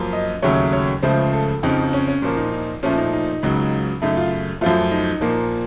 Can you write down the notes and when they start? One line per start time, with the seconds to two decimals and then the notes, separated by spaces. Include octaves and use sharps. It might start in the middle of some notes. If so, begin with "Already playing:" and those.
Already playing: F#2 F3 A#3
0.13 D#5
0.42 D#2 C#3 F#3 A3 C#5
0.73 C#5
1.02 C#2 C#3 F3 A3 C5
1.33 A4
1.63 F2 C#3 F3 D#4
1.81 D#4
1.93 C#4
2.07 C#4
2.22 A#2 F3 A#3 C#4
2.37 D#4
2.52 D#4
2.83 A#2 F3 A3 C#4
2.97 D#4
3.13 D#4
3.43 C#2 C#3 F#3
4.02 F#2 C#3 A3 D#4
4.17 F4
4.61 F#2 F3 A3 F4
4.91 D#4
5.21 A#2 F3 A#3